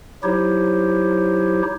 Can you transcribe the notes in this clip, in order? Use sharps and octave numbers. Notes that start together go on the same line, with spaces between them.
F#3 D#4 E4 G4 C5 C#5